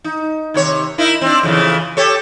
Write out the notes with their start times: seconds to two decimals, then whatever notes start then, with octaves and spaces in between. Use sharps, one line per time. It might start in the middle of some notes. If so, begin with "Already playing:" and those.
0.04 D#4
0.54 D#2 C3 C#5
0.98 D#4 E4 A#4
1.21 C4 D4
1.43 F2 C#3 E3
1.97 G4 A4 C#5